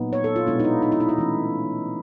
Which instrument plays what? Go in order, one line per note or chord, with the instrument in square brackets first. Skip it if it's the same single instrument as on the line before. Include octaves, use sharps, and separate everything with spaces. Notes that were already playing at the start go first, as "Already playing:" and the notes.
Already playing: [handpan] A#2 F#3 B3 D#4
C#5
A4
F4
B2 G#3 B3 D4 E4
D#4
E4
D#4
E4
D#4
E4
E3 A3 C#4